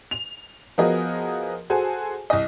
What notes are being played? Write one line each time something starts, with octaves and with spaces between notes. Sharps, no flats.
F7
F3 B3 F#4 G#4 A#4 D#5
F#4 G#4 A4 C5 G#5
C2 D#5